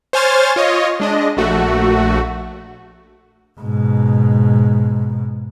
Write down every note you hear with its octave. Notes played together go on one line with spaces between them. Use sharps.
C5 C#5 G#5 F6 A6
F4 C#5 D#5
G#3 D4 D#5
A#1 A3 F#4
G#2 B2